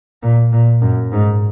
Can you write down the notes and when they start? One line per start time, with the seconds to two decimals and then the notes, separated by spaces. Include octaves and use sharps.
0.23 A#2
0.52 A#2
0.82 F#2
1.12 G#2